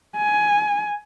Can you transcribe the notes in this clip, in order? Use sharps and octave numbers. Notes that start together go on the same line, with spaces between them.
G#5